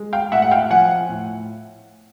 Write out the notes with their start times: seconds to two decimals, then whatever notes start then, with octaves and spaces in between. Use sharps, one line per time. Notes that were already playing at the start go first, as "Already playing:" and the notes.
Already playing: G#3
0.13 F5 G5
0.32 A2 E5 F#5
0.42 F#5
0.51 F5 G5
0.70 F3 F#5 G#5
1.09 A2